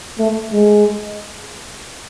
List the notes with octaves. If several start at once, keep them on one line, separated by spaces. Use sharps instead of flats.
A3
G#3